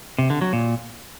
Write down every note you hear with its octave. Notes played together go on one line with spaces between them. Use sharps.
C3
D3
F#3
A#2